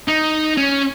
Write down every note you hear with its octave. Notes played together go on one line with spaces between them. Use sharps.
D#4
C#4